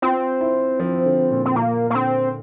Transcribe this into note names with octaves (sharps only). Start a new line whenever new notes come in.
C4 F4
E4
F3
D3
A#2
C4
A#2 A#3
A#3
D3 C4